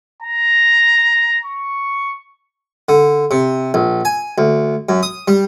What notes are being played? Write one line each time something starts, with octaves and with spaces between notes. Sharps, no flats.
A#5
C#6
D3
C3
A#1
G#5
D2
F#2
D#6
G3